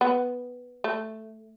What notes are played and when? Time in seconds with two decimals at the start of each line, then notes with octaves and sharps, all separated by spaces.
0.01 B3
0.84 A3